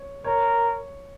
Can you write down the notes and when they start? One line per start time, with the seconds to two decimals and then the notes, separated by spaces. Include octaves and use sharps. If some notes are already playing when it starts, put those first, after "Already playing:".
Already playing: C#5
0.24 A#4 C#5